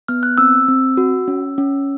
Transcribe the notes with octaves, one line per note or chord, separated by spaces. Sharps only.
B3 F6
F#6
C4 E6
C4
F#4
C#4
C#4